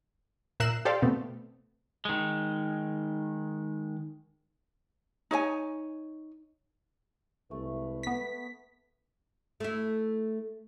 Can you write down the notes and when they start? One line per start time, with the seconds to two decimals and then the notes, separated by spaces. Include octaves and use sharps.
0.60 A#2 A#4 E5 F#6 C7 E7
0.85 G4 A4 C5 D5 F5 A5
1.02 B2 A3 B3 C4
2.05 D#3 G#3
5.31 D#4 C#5 E5 G#5
7.51 C2 G#3 A3 B4
8.03 B3 B6
9.60 A3 E4